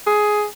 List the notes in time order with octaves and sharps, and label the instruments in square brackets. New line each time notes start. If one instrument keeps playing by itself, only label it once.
[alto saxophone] G#4